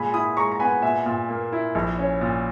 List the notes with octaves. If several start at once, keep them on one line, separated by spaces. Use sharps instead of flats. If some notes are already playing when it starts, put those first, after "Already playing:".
Already playing: A#2 G#3 G#5 B5
E4 B5 D#6
G#3 A#5 C#6
A#5
B3 G#5 B5
A#2 E5 G#5
A#2
A#3
E4
A#1
C#4
A#2